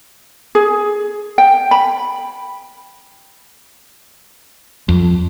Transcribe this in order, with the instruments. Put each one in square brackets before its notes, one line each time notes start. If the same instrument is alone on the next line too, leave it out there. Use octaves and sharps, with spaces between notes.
[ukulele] G#4
G5
B5
[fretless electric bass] F2